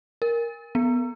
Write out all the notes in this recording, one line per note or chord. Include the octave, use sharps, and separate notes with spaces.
A#4
B3